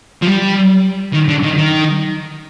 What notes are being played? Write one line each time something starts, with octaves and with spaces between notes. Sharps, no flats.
F3
G3
D#3
D3
D#3
D#3